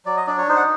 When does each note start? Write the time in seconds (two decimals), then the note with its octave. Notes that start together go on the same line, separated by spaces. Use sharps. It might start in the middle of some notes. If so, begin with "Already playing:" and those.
0.06 F#3 D5
0.17 D#5
0.27 D4 D5
0.38 C#5
0.49 D#4 C5
0.57 F#5